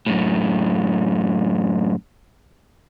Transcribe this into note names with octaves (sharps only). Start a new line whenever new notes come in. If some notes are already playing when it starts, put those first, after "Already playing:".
F#2 A2